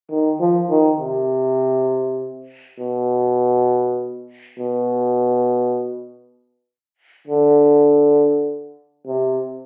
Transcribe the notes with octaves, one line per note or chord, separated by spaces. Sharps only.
D#3
F3
D#3
C3
B2
B2
D3
C3